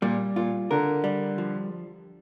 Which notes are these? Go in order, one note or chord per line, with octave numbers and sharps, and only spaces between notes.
A#2 G3
A#2 F4
D3 A#4
G3
F3